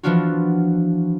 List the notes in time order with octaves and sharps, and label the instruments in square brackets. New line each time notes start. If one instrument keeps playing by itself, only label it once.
[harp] E3 F3 B3 D4 F4 F#4